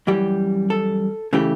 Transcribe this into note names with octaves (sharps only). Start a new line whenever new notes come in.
F#2 E3 G3 G4
A4
C#3 E3 A3 G4